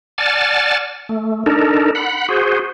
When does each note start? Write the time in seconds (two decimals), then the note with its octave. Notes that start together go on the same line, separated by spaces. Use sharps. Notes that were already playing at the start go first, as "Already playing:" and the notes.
0.18 D5 F#5 G#5 A5 F6 A6
1.09 A3
1.46 D4 D#4 A4 A#4
1.95 F#5 B5
2.29 F#4 G#4 C5